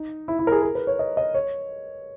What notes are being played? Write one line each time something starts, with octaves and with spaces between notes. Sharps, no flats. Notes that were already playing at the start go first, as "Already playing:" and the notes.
Already playing: D#4
E4
E4
A#4
G#4
A#4
B4
C#5
D#5
D#5
C#5